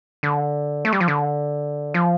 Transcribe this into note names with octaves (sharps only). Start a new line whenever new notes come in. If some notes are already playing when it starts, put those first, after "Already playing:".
D3
A3
G3
F3
D3
F3